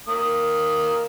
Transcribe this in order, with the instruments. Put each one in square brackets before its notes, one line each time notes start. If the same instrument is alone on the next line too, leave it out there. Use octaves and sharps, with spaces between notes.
[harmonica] A#3 D#6